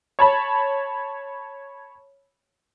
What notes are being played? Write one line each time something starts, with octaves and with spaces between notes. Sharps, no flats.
C#5 A5 B5